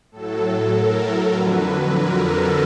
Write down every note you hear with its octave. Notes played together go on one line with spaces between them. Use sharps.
A2 F#3 A4
A#4
F2 D3 F#3 B4
A#4
A4